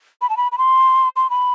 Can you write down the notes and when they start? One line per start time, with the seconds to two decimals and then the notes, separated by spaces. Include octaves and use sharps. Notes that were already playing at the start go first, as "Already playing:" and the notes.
0.22 B5
0.30 A5
0.37 B5
0.52 B5
0.58 C6
1.16 C6
1.30 B5